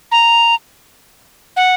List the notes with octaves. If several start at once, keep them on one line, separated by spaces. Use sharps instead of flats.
A#5
F#5